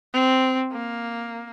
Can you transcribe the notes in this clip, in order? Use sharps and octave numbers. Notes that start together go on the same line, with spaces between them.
C4
A#3